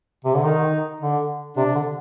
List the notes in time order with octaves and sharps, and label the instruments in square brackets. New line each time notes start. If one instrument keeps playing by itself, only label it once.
[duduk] C3
D3
[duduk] D#3 [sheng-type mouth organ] D#4
[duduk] D3
[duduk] C3 [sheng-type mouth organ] D4
[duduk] D3